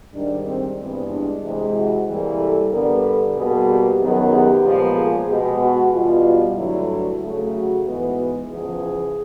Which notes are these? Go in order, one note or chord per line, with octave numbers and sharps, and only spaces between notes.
G#2 D#3 G3 D4
C4
G2 E3 G#3 B3 C4
D4
C3 E3 G#3
F#4
C3 E3 G3 A#3 G#4
A4
G2 D3 G3 B3 A#4
A4
B2 G3 A#3 G#4
G4
F#2 D#3 F#3 B3 G#4
G4
A#2 F3 G#3 B3
G#4
B2 G#3 B3 G4
F#4
E2 B2 G3 B3 F4
G2 D3 F#3 A3 E4
C#3 F#3 A3
F#4
G#2 E3 G#3 B3 F#4
E2 C#3 F3 G#4